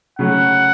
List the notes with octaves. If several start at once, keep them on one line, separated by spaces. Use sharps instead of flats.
C#3 F#3 A3 C#4 F#5